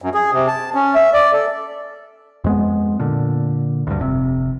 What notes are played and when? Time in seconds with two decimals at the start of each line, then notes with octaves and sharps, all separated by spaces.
0.02 F#2
0.14 G#4
0.33 C3
0.48 A5
0.74 C#4
0.95 E5
1.13 D5
1.33 A4
2.44 F2 G#3 B3
2.99 A#2 D3
3.87 D2 G2
3.99 F1 C3